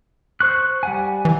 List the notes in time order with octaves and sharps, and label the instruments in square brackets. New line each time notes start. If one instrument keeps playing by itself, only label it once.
[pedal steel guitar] C5 C#6 F#6
G3 F#5 G#5
[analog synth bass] E3